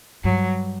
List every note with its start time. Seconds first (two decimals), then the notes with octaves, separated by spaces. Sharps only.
0.24 G2 F#3